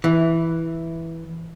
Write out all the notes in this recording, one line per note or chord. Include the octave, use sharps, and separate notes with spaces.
E3